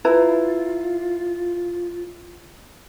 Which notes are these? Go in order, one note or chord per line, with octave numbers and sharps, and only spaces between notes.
E4 F4 B4 A#5